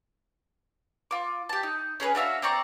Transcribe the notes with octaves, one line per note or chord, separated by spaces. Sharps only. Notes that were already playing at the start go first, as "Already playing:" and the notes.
F4 D6
G4 A5
D#4
C#4 G#4 A#4 B4
D4 F#4 E5 F5
C4 D5 A#5 C#6